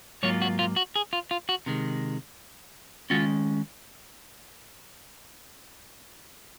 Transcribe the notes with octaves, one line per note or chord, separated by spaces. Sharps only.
G#2 F#3 A#3 F4 C#5
F#4
F4
F#4
G#4
F4
F4
F#4
C3 D#3 G#3
D#3 G#3 C#4 F4 F#4